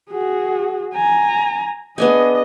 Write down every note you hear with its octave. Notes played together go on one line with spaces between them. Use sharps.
F#4 G#4
G#5 A#5
B3 D4 G#4 D#5 G#5